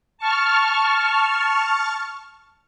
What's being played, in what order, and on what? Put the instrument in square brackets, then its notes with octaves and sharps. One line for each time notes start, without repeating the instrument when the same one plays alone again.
[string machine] A5 C#6 F6